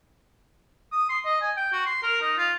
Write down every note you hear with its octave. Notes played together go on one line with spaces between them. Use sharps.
D#6
C6
D#5
G#5
G5
F#4
C6
A#4
D#4
F4